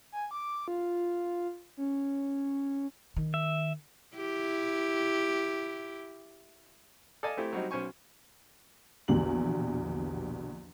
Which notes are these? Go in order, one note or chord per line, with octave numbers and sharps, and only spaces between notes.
G#5
D6
F4
C#4
D#3
E5
E4 G4
A4 D5 D#5 F5 G#5 A5
A3 C4 E4 G4
F#3 G3 C4 D#4
B1 C#4 C5 G#5 C#6
A#1 E2 B2 D3 G4 F#7